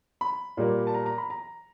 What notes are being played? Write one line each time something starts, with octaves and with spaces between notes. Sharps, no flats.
B5
A#2 G3 A#3
A5
A#5
A#5
B5
A#5